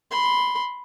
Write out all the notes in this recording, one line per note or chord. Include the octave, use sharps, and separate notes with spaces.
B5 C6